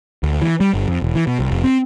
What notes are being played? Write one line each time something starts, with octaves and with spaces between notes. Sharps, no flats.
D2
E3
G3
G1
F2
E1
E3
B2
C2
F1
C4